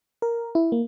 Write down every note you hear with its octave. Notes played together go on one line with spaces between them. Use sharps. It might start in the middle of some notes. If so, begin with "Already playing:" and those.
A#4
E4
A#3